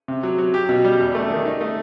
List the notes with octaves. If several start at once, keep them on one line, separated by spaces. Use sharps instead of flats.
C3
F#3
F#3
G4
B2
G3
E2
A3
D#3
D#4
A3